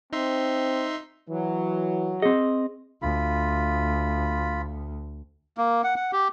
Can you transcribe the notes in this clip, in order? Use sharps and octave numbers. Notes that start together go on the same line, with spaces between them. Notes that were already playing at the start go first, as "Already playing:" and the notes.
C4 D#4 E5 C6
E3 F#3
C4 G#4 D#5
D2 F4 B5
A#3
F#5
F#5
G4